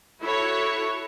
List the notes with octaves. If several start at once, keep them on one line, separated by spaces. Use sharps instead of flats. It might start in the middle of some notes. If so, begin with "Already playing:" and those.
E4 F#4 A4 C#5